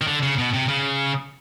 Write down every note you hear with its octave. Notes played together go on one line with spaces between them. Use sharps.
D#3
D3
C#3
B2
C3
C#3